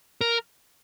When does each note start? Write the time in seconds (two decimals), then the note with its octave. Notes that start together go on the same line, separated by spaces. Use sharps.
0.21 A#4